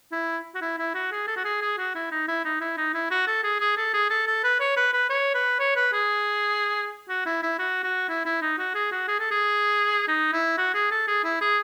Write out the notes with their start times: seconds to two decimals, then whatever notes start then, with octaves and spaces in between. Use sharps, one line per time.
0.12 E4
0.55 F#4
0.62 E4
0.78 E4
0.95 F#4
1.12 G#4
1.28 A4
1.36 F#4
1.45 G#4
1.62 G#4
1.78 F#4
1.95 E4
2.11 D#4
2.28 E4
2.45 D#4
2.61 E4
2.77 D#4
2.94 E4
3.11 F#4
3.27 A4
3.44 G#4
3.60 G#4
3.77 A4
3.94 G#4
4.10 A4
4.27 A4
4.44 B4
4.60 C#5
4.77 B4
4.93 B4
5.10 C#5
5.35 B4
5.59 C#5
5.76 B4
5.93 G#4
7.09 F#4
7.26 E4
7.42 E4
7.59 F#4
7.83 F#4
8.09 E4
8.26 E4
8.42 D#4
8.58 F#4
8.75 G#4
8.92 F#4
9.08 G#4
9.20 A4
9.31 G#4
10.08 D#4
10.33 E4
10.58 F#4
10.74 G#4
10.91 A4
11.08 G#4
11.24 E4
11.41 G#4